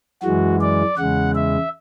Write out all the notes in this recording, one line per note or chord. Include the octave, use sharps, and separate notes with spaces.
F#2 E3 G#3 F#4
D5
E2 C#3 G#3 F#5
E5